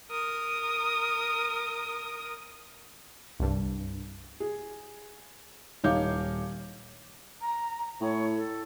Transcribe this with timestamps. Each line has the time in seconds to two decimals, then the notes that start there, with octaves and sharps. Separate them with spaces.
0.11 A#4 D#6
3.40 C2 G2
4.40 G#4
5.84 D#1 D#4 C#5 F5 D6 G6
7.41 A#5
8.01 A2 C#5
8.36 A4